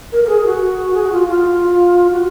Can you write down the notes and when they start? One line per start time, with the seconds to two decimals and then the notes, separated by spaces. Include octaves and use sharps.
0.12 A#4
0.24 A#4
0.29 G#4
0.41 G#4
0.46 F#4
0.94 G#4
1.03 F#4
1.12 F4
1.28 F4
1.61 F4
2.11 F#4